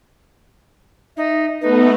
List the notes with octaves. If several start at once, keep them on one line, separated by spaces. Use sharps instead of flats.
D#4 E5
A3 B3 D#4 B4